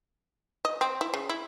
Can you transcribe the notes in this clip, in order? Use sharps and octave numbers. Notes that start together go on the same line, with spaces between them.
D#5
C4
E4
C#3
E4